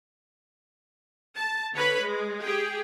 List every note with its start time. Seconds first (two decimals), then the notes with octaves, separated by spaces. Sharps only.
1.36 A5
1.73 D3 B4 C#5 B5
2.02 G#3
2.43 G4 G#4 G5